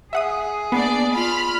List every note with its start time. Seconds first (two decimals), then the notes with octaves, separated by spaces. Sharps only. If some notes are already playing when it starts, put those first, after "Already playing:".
0.13 G#4 E5 F#5 D#6
0.72 A#3 B3 D4 D5
1.14 F4 B5 F6